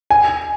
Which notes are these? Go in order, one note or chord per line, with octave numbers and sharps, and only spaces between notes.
G#5